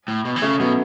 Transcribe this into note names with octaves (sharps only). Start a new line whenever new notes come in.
A2
B2
E3
C#3 A3 C#4
B2 F#3 B3